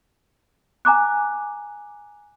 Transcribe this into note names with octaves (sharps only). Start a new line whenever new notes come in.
G#5 A#5 D6 F#6